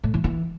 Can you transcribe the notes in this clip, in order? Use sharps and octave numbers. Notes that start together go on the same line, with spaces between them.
A2
E3
E3